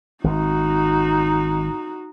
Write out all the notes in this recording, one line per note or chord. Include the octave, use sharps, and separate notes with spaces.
G#1 D#4 F#4